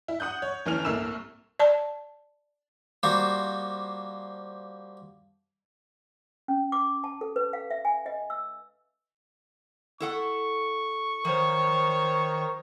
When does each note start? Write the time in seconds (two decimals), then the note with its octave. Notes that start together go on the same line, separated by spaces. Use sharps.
0.08 E4
0.20 F#5 D#6 F#6 G6
0.42 C#5
0.66 G1 E3 C#4 F6 F7
0.85 C2 A2 A3 A#3 E6 E7
1.59 D5 A5
3.03 F3 G3 A#3 F#4 C5
6.48 C#4
6.72 D6
7.04 A5
7.21 A4
7.36 B4
7.53 F5
7.70 E5
7.85 G#5
8.06 D#5
8.30 E6
10.00 E4 A4 F#5 C#6
11.25 D#3 F3 C5 C#5